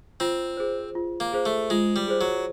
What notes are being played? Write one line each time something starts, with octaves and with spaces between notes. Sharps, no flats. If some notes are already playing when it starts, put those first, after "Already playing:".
C4 F4
G#4 C5
F4
A#3
G#4 C5
A3
G#3 F4
G3
G#4 C5
F#3